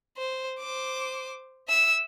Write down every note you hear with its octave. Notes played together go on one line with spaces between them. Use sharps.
C5
C5 D6
E5 E6